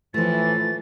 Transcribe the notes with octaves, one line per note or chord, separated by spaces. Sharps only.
A2 E3 F3 A3 A6